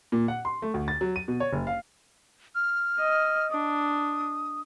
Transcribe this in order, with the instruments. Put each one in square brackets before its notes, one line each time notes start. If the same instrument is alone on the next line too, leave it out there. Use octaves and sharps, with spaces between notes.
[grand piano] A#2
F#5
C6
A3
D2
A6
F#3
D#7
B2
C#5
F#1
F5
[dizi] F6
[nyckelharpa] D#5
[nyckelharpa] D4 [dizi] D#6